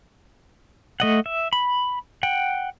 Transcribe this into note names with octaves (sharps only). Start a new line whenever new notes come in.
A3 D#5 F#5
E5
B5
F#5 G5